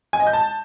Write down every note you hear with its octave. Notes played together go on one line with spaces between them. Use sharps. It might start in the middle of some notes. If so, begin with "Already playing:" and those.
G#5
D#5
G6
A5